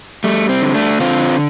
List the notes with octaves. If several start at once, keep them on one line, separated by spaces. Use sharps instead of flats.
G3 A3
C4
D3
A3 D4
D3 C4 F4